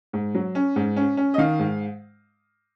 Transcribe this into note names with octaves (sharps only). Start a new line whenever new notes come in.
G#2
F#3
C#4
G#2
C#4
C#4
D#5
D#3 F5
G#2